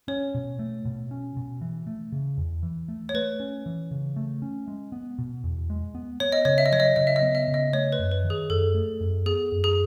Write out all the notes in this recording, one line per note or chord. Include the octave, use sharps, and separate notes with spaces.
C#4 C#5
B2
A3
B2
C#4
B2
E3
A3
C#3
E2
E3
A3
C#5
A3 B4
C#4
E3
C#3
A3
C#4
G#3
B3
B2
E2
G#3
B3
B3 C#5
D#5
C#3 C#5
E5
D#5
F#3 C#5
D#5
C#3 D#5
E5
D#5
B3
E5
C#3
D#5
A3 C#5
B4
F#2
B4
D#3
G#4
F#2 A4
A3
F#2
B3 G#4
F#2
G#4